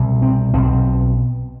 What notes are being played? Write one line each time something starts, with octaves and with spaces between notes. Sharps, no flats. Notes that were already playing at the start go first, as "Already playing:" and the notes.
Already playing: C2 B2
C4
B1 B2 C4